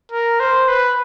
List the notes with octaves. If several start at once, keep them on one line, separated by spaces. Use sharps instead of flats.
A#4
C5
B4